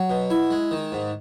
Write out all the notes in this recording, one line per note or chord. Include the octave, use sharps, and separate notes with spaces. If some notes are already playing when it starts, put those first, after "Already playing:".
Already playing: F#3
B2
E4
G#3
D#3
G#2